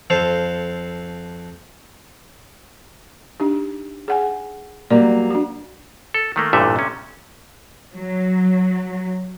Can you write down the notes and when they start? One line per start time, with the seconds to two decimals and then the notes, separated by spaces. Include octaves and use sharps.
0.10 F2 A4 C5 F5
3.40 D4 D#4 G4
4.08 G#4 F#5 G#5
4.90 F#3 G3 A#3 D5
5.31 D4 F#4
6.14 A4
6.36 D#3 A3 A#3
6.53 A1 G2 A#2 D3 A3 E5
6.76 C3 C#4
7.94 F#3